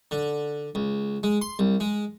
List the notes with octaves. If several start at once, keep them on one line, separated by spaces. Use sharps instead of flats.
D3
C#2
G#3
C6
C2
G#3